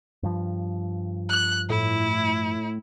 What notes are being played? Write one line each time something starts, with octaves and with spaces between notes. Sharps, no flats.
G2 F3
F#6
A2 E4